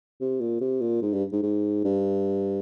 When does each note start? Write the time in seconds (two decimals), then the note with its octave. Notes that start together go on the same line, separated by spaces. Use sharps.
0.21 C3
0.41 A#2
0.61 C3
0.81 A#2
1.02 G#2
1.13 G2
1.32 G#2
1.43 G#2
1.84 G2